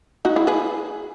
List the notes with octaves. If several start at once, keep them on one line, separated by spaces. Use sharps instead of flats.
D#4 F#4
E4 G#4
G#4 B4